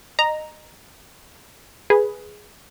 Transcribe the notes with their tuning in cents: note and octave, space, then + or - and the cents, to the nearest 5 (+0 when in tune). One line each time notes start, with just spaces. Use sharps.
D#5 -25 A#5 +0
G#4 +0 B4 -5